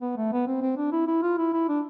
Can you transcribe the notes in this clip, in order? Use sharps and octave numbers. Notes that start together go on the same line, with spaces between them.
B3
A3
B3
C4
C4
D4
E4
E4
F4
E4
E4
D4